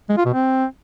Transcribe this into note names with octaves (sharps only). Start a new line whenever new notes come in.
G#3
F4
B2
C4